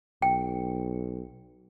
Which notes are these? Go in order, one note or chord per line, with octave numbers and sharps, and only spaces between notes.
B1 G5